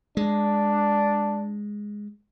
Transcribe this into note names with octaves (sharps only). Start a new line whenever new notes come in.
G#3 D4